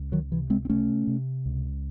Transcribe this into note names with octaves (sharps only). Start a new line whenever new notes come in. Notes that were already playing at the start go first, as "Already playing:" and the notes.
Already playing: C#2
D#3 F#3
C3 E3
G#3 C4
C4
C3 A3 C#4
C3
C#2